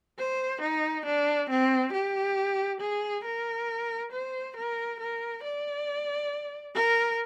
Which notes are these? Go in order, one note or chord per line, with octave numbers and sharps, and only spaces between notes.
C5
D#4
D4
C4
G4
G#4
A#4
C5
A#4
A#4
D5
A#4